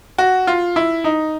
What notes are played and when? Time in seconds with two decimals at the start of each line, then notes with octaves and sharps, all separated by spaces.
0.18 F#4
0.47 F4
0.76 E4
1.04 D#4